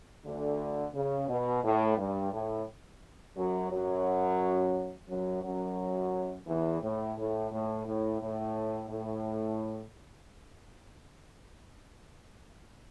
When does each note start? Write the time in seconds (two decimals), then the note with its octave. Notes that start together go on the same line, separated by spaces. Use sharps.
0.25 D2 D3
0.94 C#3
1.29 B2
1.64 A2
1.98 G2
2.32 A2
3.36 F#2 F#3
3.71 F#2 F#3
5.09 F#2 F#3
5.43 F#2 F#3
6.47 E2 E3
6.82 A2
7.17 A2
7.52 A2
7.86 A2
8.21 A2
8.89 A2